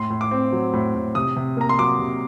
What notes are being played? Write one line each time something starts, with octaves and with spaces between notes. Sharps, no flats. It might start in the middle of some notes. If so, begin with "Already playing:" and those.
Already playing: A2 C6
A2
D6
C4
F#3
A2
A2
C3 D#6
C3
A#3 A#5
C6
F#3 D6
C3